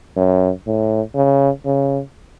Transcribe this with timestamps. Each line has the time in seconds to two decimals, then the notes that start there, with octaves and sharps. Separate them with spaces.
0.16 F#2
0.67 A2
1.15 C#3
1.66 C#3